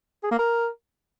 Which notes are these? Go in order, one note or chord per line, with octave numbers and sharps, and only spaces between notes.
G#4
A#3
A#4